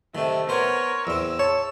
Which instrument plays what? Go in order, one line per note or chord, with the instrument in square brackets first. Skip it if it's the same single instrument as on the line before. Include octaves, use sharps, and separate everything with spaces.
[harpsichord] C3 D#3 [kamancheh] A3
[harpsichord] B3 C5 [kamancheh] A#4 C#5
[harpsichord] E2 C4 [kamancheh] E6
[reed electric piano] C#5 [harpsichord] A5